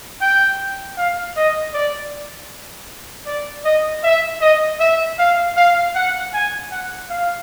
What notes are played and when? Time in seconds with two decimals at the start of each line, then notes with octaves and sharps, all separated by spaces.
0.21 G5
0.97 F5
1.36 D#5
1.74 D5
3.26 D5
3.65 D#5
4.03 E5
4.41 D#5
4.80 E5
5.18 F5
5.56 F5
5.95 F#5
6.33 G#5
6.71 F#5
7.09 F5